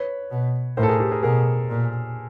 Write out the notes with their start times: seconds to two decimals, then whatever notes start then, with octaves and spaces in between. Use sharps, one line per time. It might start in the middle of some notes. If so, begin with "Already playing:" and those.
Already playing: B4 C#5
0.31 B2
0.77 A2 A#4 C5
0.83 A4
0.88 G#4 A#4
1.00 G4 A4
1.11 G#4 A#4
1.23 B2 G#4 A#4
1.69 A#2